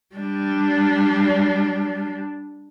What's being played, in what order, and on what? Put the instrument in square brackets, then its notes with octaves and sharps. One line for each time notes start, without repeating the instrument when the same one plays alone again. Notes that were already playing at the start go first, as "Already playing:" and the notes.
[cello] G3 D4